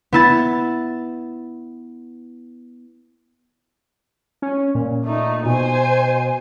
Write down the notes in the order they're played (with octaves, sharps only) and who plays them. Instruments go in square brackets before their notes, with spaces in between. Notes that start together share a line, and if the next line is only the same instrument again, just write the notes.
[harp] B3 E4 A6
[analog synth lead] C#4
A#2
[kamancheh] A3 D#4
[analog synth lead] B2 [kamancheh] C5 G#5